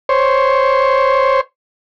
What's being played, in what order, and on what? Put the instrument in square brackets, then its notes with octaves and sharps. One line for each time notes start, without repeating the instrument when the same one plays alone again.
[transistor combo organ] C5 C#5